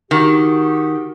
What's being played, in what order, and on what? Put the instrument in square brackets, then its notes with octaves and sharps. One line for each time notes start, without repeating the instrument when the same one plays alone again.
[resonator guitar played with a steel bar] D#3 [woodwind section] F#4 G4